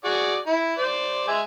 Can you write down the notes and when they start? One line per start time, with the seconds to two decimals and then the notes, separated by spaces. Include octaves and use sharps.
0.04 F#4 G#4 D5
0.47 E4
0.78 C5 D5
1.28 G#3 E5 G#5